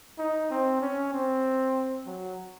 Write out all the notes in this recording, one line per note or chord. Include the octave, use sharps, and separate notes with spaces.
D#4
C4
C#4
C4
F#3